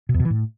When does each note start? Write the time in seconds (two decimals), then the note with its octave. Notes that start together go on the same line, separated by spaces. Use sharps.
0.09 B2
0.14 E2
0.20 B2
0.25 E3
0.30 A2